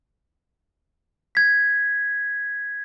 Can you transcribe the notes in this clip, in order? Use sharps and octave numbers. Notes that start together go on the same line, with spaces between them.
G#6 B6